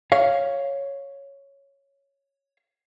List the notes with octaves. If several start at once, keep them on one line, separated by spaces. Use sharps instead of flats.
C#5 F5